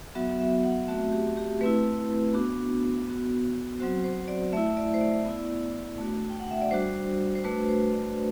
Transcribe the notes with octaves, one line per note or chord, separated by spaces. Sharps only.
F#3 B3 F#4 E5
E5
E5
F#5
A3 C4 F#4 E5
G4
G4
A3 C4 E4 B4
B3 D4 F#4
B3 F#4
F#3 C4 F#4 C5
C5
D5
A3 E4 E5
D5
C5
D5
B3 E4
A3 D4 F#4
G5
F#5
E5
D5
G3 D4 F#4 C5
C5
A3 D4 F#4 B4
C5
D5